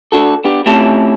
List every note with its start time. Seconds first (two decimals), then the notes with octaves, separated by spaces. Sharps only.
0.12 D4 F#4 A4
0.44 B3 D4 G4
0.66 A3 C4 C#4 E4 G4 A5